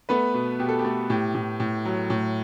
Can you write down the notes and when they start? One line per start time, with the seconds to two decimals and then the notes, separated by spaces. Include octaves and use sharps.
0.09 A3 B3 B4
0.34 B2
0.60 B2 G4
0.69 A4
0.79 G4
0.85 A3
1.10 A2 G4
1.35 A2
1.60 A2
1.85 F#3
2.10 A2